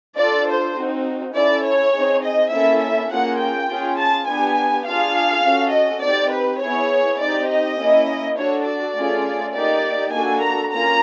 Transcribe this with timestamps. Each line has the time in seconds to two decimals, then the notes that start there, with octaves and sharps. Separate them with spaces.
0.17 D4 F4 A4 D5
0.47 C5
0.76 C4 D#4 F#4
1.33 C#4 E4 A4 D5
1.64 C#5
1.92 C4 D#4 G#4
2.21 D#5
2.51 A#3 C#4 E4 A4 E5
2.81 E5
3.09 A#3 C#4 F4 G#4 F#5
3.39 G5
3.68 C#4 F4 G#4
3.97 A5
4.26 B3 D4 G4 G#5
4.85 D4 F4 G#4 F5
5.44 C#4 F#4 A4
5.73 D#5
6.02 C4 D#4 G4 D5
6.32 B4
6.60 B3 E4 G#4 C#5
7.19 C4 D#4 G4 D5
7.49 D#5
7.77 A#3 C#4 E4
8.36 D4 F#4 A4 C#5
8.65 D5
8.94 A3 C#4 F4 G#4
9.53 A#3 D#4 G4 D5
10.11 A#3 D4 F#4 A4 G#5
10.41 A#5
10.70 A#3 C#4 F4 A#5